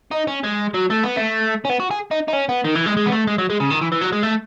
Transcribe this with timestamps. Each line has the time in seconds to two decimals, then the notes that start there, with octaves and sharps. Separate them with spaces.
0.11 D#4
0.27 C#4
0.44 G#3
0.74 F#3
0.90 A3
1.04 B3
1.16 A3
1.65 C#4
1.69 B3
1.80 F#4
1.91 G#4
2.11 D#4
2.28 D#4
2.33 C#4
2.49 B3
2.65 D#3
2.75 E3
2.86 G#3
2.97 G#3
3.06 B3
3.12 A3
3.27 G#3
3.38 F#3
3.50 G#3
3.60 C#3
3.70 D#3
3.81 E3
3.92 E3
4.01 F#3
4.12 G#3
4.23 A3